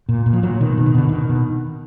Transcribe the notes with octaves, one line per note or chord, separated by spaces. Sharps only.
A#2
A#2
F3
A#2 F#3
B2 D#3
B2
D#3
B2 D3
B2 D#3
B2